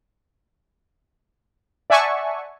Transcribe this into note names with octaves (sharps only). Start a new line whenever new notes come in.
D5 E5 F#5 G#5 A5 C#6